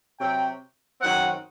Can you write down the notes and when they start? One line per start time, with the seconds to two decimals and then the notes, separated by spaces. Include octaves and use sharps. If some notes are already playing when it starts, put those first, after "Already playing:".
0.20 C3 F#3 C4 G5
1.01 F#2 D#3 F#3 C4 F#5